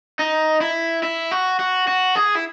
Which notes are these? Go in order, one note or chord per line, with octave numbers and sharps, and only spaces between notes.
D#4
E4
E4
F#4
F#4
F#4
G#4
E4